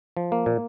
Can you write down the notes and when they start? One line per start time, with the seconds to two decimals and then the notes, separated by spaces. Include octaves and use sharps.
0.17 F3
0.32 A#3
0.46 A#2